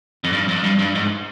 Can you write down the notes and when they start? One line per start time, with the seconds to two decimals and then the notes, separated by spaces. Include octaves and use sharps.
0.24 F2
0.32 G2
0.48 F2
0.63 G2
0.79 G2
0.95 G#2